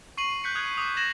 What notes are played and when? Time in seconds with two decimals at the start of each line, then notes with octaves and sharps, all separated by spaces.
0.18 C#6 C7 D#7 F#7
0.44 F#6 G6 B6 C#7
0.55 D#6 F#6 G#6
0.78 D6 D#6
0.97 G#6 A#6 E7 F#7